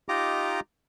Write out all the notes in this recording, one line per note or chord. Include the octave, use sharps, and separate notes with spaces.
D#4 F4 G4 D#5 A#5 D6